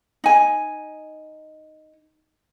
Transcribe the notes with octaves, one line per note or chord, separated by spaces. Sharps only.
D#4 G#5